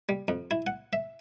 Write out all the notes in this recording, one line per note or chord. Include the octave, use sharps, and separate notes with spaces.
G3
F2
E4
F#5
E5